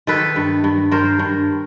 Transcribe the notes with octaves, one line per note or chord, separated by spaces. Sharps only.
D#3 A4 B4
G2
G2
G2 A#4 C5
G2